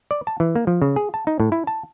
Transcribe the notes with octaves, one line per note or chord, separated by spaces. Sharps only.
D5
A5
E3
A#3
F3
C#3
G#4
A5
D#4
A2
E4
A5